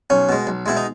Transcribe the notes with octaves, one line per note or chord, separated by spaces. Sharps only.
B1 C#4
B2 G#3
B1
B2 G#3 E4
D#4